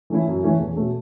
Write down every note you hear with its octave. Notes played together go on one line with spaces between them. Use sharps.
E3 A3 C#4 E4
F#2
E3 A3 C#4 E4
E2
B2 A3 C#4